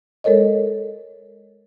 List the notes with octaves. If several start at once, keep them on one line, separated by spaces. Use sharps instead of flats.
G#3 A4 A#4 C#5 D#5